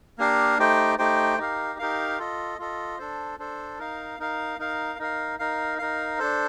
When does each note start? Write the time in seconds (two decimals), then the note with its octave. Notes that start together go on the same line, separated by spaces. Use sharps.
0.18 A#3 D4 G4 A#4 F5
0.59 A3 D#4 G4 C5 G5
0.98 A3 D#4 G4 C5 G5
1.38 D#4 G4 A#4 F5
1.79 D#4 G4 A#4 F5
2.19 F4 A4 D#5
2.59 F4 A4 D#5
2.98 D4 A4 C5
3.39 D4 A4 C5
3.79 D#4 A#4 F5
4.20 D#4 A#4 F5
4.59 D#4 A#4 F5
4.99 D#4 A#4 F5
5.39 D#4 A#4 F5
5.78 D#4 A#4 F5
6.19 D4 A4 C5